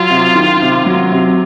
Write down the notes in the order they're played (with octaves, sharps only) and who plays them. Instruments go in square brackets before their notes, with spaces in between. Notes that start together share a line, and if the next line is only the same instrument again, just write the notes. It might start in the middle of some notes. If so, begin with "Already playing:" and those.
Already playing: [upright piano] F#3 [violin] F4
[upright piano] C3
D#3
C3
F#3
C3